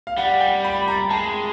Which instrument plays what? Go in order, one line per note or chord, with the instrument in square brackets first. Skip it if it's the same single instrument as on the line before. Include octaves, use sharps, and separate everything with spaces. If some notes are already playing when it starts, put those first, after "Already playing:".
[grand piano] F5
[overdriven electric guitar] G3 [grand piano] F#5
[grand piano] G5
B5
A#5
[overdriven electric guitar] G#3 [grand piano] A5